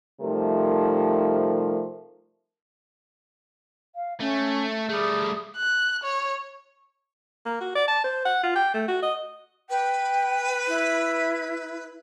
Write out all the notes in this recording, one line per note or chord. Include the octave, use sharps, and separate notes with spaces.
C3 F3 G3 A3 D#4 A#4
F5
A3 C#4
G3 A3 G#4
F#6
C#5
A#3
F#4
D5
A5
C5
F#5
F4
G5
A3
F#4
D#5
B4 G5
E4